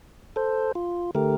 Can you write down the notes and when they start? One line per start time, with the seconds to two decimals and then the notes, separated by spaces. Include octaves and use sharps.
0.36 A4 C5
0.75 F4
1.15 D3 A3 G4 A#4